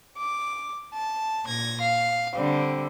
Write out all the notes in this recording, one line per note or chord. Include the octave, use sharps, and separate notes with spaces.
D6
A5
A#2 G#6 A#6
F5
D3 G3 C4